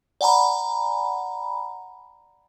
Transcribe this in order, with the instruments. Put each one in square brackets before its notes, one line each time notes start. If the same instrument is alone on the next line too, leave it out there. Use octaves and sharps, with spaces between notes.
[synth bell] D5 F#5 G#5 A#5 B5